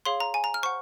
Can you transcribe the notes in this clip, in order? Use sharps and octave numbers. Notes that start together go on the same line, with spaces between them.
G#4 C#5 F5 C6
A#5
G#5
A#5
F6
C5 F#5 C#6